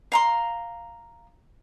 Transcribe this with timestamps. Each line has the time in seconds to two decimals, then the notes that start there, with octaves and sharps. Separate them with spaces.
0.12 F5 A#5 C6